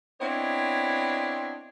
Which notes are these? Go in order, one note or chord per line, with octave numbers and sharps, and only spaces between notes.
B3 C4 D4 E4 C#5 D#5